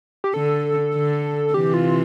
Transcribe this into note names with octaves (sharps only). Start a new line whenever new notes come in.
G4
D3 A4
D3
C3 E3 G4
F4